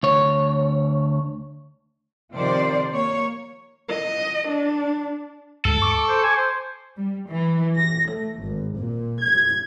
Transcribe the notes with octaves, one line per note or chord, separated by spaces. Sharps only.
D2 C#5
C3 D#3 F3 C5 D5
A#3 C#5
D#5
D4
D2 G#2 A4
C#6 D6
C5
G#5
C5
G3
E3
A#6
A3
G#1
A#2
G#6